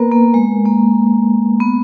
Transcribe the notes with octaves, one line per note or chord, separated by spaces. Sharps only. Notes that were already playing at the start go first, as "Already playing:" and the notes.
Already playing: A#3 B3 A#4 B4
A#3
G#3
A#3
B3